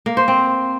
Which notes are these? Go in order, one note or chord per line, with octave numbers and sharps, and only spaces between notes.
A#3
C5
C4